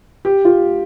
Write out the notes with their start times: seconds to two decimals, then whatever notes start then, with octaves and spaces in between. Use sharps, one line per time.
0.25 G4
0.45 F4